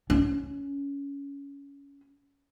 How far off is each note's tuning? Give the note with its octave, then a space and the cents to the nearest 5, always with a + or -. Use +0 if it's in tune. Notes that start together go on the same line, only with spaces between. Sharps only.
C#4 +20